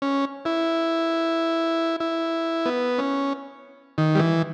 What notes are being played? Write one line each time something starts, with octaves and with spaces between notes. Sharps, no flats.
C#4
E4
E4
B3
C#4
D#3
G3
E3